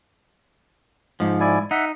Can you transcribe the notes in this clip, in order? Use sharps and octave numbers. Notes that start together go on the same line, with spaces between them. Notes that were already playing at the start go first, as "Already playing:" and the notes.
G#2 F3
E4 D5 G#5
D#4 E5 F#5